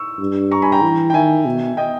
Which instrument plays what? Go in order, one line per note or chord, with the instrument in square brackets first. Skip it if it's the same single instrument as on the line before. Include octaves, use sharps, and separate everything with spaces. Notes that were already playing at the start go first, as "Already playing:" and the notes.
Already playing: [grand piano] C#6 E6
[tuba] G2
[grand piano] A#5 C#6
G#5 B5
G5 A#5
[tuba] E3
[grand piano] G5
[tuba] D#3 [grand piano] E5 G#5
[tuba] B2
[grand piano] D#5 G5